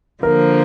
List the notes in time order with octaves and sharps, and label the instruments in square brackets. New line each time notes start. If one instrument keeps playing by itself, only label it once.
[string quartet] D3 F3 A#3 [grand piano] A#4